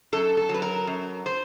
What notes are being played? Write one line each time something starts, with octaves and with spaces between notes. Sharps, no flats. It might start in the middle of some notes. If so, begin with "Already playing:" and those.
F#2 A4
A4
F#3
B4
A#4
F#2
C5